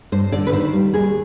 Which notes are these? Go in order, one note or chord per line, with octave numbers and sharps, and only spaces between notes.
G2 C5
D3 D5
B4
D#3 C5
G3
D#2 G#4